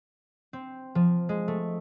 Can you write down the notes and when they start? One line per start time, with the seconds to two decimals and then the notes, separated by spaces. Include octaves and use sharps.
0.53 C4
0.95 F3
1.29 G#3
1.48 A3